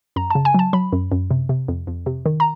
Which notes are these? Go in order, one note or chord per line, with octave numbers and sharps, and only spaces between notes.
F#2 A#5
C#3 A5
G#5
F#3 A5
F#3 B5
F#2
F#2
C3
C3
F2
F2
C3
D#3
A#5